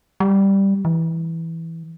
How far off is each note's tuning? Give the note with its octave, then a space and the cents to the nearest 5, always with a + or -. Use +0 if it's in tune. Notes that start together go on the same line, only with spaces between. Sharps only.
G3 +0
E3 -5